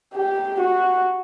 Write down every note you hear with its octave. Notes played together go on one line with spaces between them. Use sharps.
G4
F#4